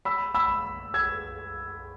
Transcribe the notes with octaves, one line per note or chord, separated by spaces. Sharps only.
B5 E6
B5 E6
E6 G#6